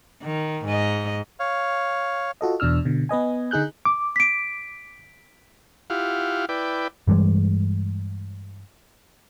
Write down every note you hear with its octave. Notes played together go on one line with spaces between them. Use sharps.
D#3
G#2 D#5
C#5 F5
F4 F#4 A4 D#5
E2 B2 D4 E6 F6
B2 D3
B3 B4 D#5 G#5
D3 D#4 G#4 F#6 G6
D6
B6 D7
E4 F4 G4 F5 F#5
E4 B4 D5 G5
G2 E3 G3 G#3